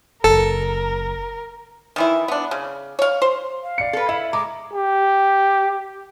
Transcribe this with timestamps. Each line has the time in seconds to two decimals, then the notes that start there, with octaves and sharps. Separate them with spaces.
0.24 F#1 A4 A#4
1.96 D#3 E3 E4
2.28 B3 D4
2.51 C#3
2.99 C#5 F5
3.22 C5
3.63 F5
3.78 D5 C#7
3.93 A4 B4
4.09 E4 E5
4.33 G#3 A#5 D6
4.73 G4